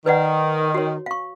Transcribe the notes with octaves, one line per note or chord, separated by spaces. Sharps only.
D#3 B4 D5 F#5
F#4 C#5
F5 C#6